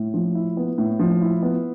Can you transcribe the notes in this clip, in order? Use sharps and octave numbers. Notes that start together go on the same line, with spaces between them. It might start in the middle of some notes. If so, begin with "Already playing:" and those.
Already playing: A2
F3
E4
B3
A2
F3
E4
B3